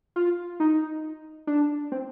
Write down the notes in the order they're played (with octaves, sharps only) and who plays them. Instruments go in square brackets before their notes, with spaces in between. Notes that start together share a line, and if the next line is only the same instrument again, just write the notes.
[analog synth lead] F4
D#4
D4
C4